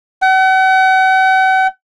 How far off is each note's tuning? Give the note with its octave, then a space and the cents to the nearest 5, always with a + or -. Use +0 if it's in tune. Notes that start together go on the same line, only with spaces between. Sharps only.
F#5 +40